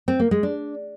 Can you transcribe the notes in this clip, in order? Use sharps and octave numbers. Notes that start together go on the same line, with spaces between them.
C4
A#3
G#3
D4